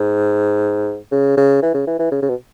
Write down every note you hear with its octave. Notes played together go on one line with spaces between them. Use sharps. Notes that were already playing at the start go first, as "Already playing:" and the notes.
Already playing: G#2
C#3
C#3
E3
C#3
E3
E3
C#3
C#3
B2